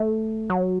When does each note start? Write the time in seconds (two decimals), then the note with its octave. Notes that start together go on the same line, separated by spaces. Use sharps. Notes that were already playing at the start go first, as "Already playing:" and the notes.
Already playing: A3
0.50 F#3